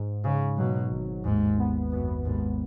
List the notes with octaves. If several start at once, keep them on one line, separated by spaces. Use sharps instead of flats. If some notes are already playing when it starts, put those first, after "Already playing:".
Already playing: G#2
G#2 C#3
B2 F#3
G#1
D#2 G#2
B3
F#2 B3
D#2 G#2